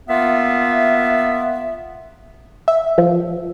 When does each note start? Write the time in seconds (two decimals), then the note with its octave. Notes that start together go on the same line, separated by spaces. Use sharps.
0.09 A#3 B3 F4 E5
2.68 E5
2.98 F3